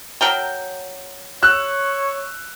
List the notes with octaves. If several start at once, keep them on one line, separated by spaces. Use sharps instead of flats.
F#3 A#4 G5
C#5 E6 F#6